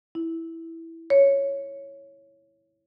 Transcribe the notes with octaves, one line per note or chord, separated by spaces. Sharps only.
E4
C#5